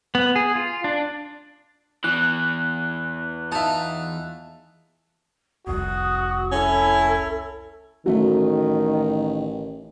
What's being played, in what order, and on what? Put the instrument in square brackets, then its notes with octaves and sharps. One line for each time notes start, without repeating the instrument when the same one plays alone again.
[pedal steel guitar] B3
G#4
F4
D4
[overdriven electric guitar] E2 E3 [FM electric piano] F#6
[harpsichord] D#4 F4 [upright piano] E5 A5
[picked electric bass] F1 C2 [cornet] F#4 [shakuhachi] D#6
[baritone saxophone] C#4 [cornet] E4 [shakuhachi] A4
[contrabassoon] A1 [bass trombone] D#3 [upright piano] F#3 A3